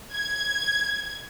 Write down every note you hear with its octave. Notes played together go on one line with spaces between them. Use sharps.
G#6